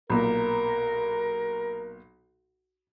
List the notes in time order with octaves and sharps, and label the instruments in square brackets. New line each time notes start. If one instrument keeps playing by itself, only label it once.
[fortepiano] B1 A#2 [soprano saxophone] A#4